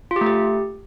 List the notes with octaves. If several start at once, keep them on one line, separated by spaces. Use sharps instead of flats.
F4
G4
A3
G4